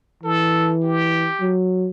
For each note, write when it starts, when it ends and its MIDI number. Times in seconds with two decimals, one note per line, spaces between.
0.24 1.29 52
0.24 0.75 69
0.83 1.55 67
1.41 1.90 54